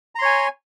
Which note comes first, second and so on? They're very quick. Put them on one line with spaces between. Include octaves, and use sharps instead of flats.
A#5 C6 C#5 G#5